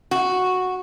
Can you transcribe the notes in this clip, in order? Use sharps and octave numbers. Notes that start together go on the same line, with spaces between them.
F#4